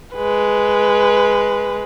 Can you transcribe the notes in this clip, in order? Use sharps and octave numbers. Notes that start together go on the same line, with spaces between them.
G#3 B4